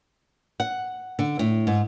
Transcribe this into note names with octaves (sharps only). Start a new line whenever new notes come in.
F#5
D3
A2
G#2